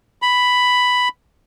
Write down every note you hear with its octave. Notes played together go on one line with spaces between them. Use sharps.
B5